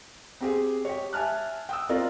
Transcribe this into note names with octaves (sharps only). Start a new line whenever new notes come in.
C4 G4 G#4
G4 C#5
E5 G#5 A5 F6 F#6
G5 D#6 E6
C4 F4 A#4 D5